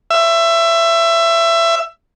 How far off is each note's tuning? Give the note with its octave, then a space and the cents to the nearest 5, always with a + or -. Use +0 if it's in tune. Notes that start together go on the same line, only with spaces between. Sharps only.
E5 +20